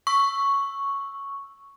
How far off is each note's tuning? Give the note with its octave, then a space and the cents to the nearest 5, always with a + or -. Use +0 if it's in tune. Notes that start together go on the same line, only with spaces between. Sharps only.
C#6 +0 E6 +0